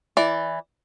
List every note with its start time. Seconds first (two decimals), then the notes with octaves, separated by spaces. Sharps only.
0.17 E3 D5